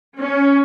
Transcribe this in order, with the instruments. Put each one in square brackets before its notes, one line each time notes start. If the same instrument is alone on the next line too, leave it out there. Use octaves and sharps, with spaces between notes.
[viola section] C#4